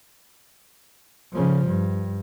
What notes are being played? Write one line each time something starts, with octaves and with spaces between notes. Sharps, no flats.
C#3 F3
G2